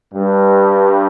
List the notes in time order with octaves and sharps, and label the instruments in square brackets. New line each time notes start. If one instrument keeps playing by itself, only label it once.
[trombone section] G2